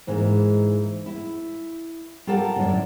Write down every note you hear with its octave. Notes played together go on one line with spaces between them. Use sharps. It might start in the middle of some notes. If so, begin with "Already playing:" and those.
G#2 E3 G#3 A#3 D#4
E4
F4 G4 A4 A#4 F5 F#5
F#2 A2 D3